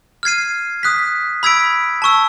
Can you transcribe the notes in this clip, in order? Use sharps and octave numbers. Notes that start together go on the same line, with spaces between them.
F6 G#6 C7 D#7
D#6 F#6 B6
B5 E6 G#6 B6 D7
A5 C#6 E6